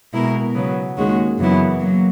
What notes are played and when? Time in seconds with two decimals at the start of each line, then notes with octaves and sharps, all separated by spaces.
0.12 B2 G#3 B3 E4 A#4
0.54 C#3 F#3 B3
0.96 D#2 D#3 G#3 C#4 F#4
1.38 F#2 C#3 E3 B3 E4
1.80 F#3 A#3